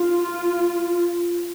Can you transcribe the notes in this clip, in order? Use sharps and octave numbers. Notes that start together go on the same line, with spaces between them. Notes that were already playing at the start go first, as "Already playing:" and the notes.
Already playing: F4